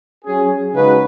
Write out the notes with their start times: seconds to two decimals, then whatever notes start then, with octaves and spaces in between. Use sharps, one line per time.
0.25 F#3 C#4 G#4
0.74 C#3 G#3 D#4 F#4 B4